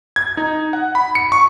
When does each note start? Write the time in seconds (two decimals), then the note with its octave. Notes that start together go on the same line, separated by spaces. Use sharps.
0.16 G#6
0.37 D#4
0.73 F#5
0.95 B5
1.15 C#7
1.32 C#6